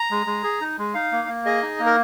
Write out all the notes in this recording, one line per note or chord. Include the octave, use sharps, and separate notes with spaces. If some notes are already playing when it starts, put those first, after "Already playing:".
Already playing: A#5
G#3
G#3
G#4
D#4
G#3
D#4 F5
A#3
A#3
G#4 D#5
D#4
A#3
A#4